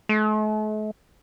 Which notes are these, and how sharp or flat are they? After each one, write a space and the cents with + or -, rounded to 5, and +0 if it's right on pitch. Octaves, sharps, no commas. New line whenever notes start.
A3 -45